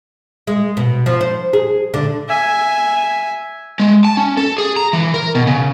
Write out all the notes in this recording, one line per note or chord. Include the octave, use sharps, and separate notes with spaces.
G#3
B2
F3
C5
G#4
D3
E5 G#5
G#3
A5
C#4
A4
G#4
A#5
E3
A#4
B2
C#3